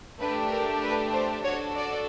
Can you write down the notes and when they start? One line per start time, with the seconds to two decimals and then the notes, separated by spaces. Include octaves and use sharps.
0.19 A3 D4 G4 B4
0.50 A#4
0.82 B4
1.13 C5
1.44 D4 F#4 A4 C#5
1.76 D5